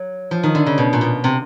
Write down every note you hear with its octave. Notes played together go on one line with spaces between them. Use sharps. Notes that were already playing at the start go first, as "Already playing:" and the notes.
Already playing: F#3
F3
D#3
D3
C#3
B2
A#2
B2
C3